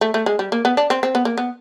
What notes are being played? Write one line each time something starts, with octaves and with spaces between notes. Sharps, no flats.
A3
A3
G#3
G3
A#3
B3
D4
C4
C4
B3
A#3
B3